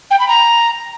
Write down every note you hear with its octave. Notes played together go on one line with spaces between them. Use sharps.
G5
B5
A#5